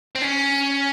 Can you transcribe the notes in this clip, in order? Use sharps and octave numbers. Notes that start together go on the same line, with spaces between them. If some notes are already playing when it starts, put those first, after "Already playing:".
C4
C#4